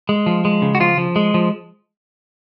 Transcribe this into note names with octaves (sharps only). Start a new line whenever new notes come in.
G#3
F3
G#3
C#3
F#4
F3 F4
F3
G#3
F3